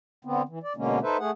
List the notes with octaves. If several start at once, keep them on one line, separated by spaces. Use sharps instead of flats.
D3 B3 C4
E3
D5
B2 D3 G#3 A#3 C#4
D#4 A4 B4 C5 E5
A3 G#4 F#5